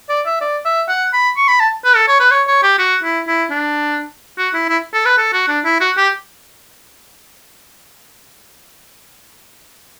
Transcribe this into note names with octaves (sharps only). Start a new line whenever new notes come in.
D5
E5
D5
E5
F#5
B5
C#6
B5
A5
B4
A4
C#5
B4
C#5
C#5
G4
F#4
E4
E4
D4
F#4
E4
E4
A4
B4
A4
F#4
D4
E4
F#4
G4